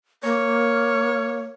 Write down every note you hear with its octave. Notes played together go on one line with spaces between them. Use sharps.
A#3 C#5